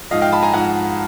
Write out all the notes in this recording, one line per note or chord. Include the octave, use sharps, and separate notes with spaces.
G#2 F3 D#5 F5
F5 G5
A5 B5
G#5 A#5
G#2 F3 F#5 G#5